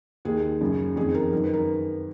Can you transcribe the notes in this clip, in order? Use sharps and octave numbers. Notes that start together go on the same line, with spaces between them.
D#2 D#3 G#4
F#2 C#3
F2 D#3 G#4
A#4
F#2 D#3 A#4
B4
A#4